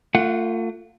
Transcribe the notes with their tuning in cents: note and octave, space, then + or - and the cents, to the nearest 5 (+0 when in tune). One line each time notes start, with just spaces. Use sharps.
A3 +35 F4 +0 F#5 +0